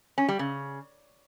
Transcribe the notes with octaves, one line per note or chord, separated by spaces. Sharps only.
C#4
G3
C#3